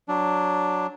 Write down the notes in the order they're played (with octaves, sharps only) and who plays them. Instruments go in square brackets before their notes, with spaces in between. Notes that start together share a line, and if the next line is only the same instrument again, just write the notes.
[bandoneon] F#3 D4